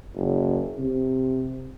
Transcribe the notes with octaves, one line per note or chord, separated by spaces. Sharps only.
F#1
C3